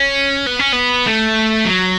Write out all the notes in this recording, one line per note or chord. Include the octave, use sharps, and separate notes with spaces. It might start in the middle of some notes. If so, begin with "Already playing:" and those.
Already playing: C#4
B3
C#4
B3
A3
F#3